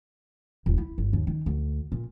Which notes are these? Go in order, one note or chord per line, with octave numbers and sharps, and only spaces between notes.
D#1
E4
G1
D#2
D#3
D2
A#2